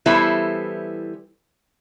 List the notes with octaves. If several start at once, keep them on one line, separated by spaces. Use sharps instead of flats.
E3 G3 B3 E4 A4 C5